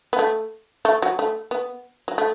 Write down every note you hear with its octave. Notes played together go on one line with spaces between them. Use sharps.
B3
A3
A3
F#3
A3
B3
F#3
A3